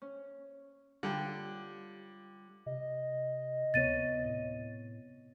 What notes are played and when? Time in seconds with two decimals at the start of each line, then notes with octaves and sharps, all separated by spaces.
0.02 C#4
1.03 D3 G3 F4 G5
2.66 C3 D#5
3.74 D2 C3 B3 C#5 A6 D#7
4.24 A2